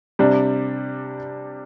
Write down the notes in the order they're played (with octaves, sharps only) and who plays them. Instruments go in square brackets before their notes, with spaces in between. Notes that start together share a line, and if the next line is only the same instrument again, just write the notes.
[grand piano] C3 G3 D4